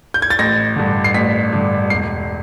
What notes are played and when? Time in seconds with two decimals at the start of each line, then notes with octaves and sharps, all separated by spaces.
0.14 G6
0.22 G#6
0.30 A6
0.39 A1 A#6
0.76 G2 D3
1.04 C7
1.14 A1 B6
1.53 G2 D3
1.90 E1 C7